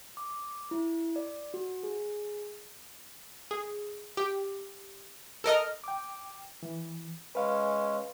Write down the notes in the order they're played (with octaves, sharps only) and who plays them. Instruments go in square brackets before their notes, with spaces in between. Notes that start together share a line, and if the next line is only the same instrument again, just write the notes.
[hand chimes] D6
E4
D5
F#4
G#4
[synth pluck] G#4
G4
A4 A#4 D#5 F6
[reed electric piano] G5 D6
E3
[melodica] G#3 C#4 [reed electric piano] B4 F5